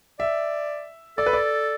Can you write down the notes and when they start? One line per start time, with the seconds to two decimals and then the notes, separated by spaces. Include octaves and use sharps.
0.19 D5 E5
1.18 A4 D5
1.26 B4
1.33 D5